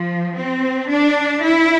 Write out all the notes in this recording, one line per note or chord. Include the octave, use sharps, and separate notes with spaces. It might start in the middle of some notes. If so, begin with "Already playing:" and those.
Already playing: F3
C4
D4
E4